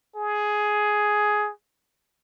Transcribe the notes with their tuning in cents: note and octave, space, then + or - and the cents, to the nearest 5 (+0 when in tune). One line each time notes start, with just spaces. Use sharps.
G#4 +10